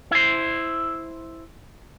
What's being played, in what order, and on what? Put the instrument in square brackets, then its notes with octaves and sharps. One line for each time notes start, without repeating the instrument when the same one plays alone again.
[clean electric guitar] E4 C5